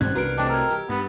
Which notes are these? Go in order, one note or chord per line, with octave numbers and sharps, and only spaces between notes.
G#2 C3 G3 C#4 F#6 G#6
C2 B3 D4 F#4 A#4 B4 D7
C3 A3 D4 D#5 G5 A5
A#4 E6 G#6
G4
G2 B3